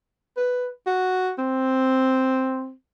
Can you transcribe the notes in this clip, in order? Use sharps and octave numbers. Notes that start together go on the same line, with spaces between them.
B4
F#4
C4